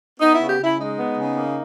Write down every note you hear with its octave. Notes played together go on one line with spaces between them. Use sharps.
B3 D#4
C#3 E4
G4
C#3 E4
G#3 D#4
B3
C#3
A#3